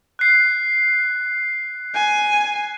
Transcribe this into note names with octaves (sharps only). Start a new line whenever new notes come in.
F#6 C7
G#5